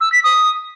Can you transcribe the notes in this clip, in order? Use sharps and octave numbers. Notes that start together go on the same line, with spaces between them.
E6
B6
D#6